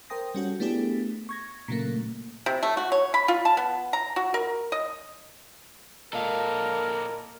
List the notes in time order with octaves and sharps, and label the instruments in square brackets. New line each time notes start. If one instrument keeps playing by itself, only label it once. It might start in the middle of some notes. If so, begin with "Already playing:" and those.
[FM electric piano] A#4 C5 G5 D#6 A#6
G3 C#4 F#4 A4
A3 B3 D4 E4 G4 G#4
C#6 G#6 A#6
A#2 C#3 F#3 A3 A#3
[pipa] C3
A3
F#4
C#5
B5
F4
A5
B3
A#5
F#4
A#4
D#5
[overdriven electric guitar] A#2 A4 [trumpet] A#4 [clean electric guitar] D#5 F5